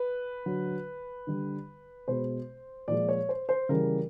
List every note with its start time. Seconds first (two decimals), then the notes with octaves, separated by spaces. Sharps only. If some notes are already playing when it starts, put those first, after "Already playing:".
Already playing: B4
0.46 D3 F#3
1.27 D3 G3
2.08 B2 G#3 C5
2.88 A#2 F3 G#3 D5
3.09 C#5
3.29 C5
3.49 C5
3.69 C#3 E3 G3 A#4